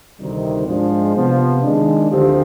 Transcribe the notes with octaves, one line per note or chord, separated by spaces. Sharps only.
D2 C3 D#3 G3
G#2 F3 G#3 D4
C3 F3 B3
D#3 G#3 D4
D2 D3 F3 C4 G4